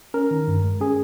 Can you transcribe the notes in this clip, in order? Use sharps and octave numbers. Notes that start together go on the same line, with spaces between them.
C#4 A#4
D#3
G2
G#3
C#4 G#4